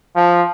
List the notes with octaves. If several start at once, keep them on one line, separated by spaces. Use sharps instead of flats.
F3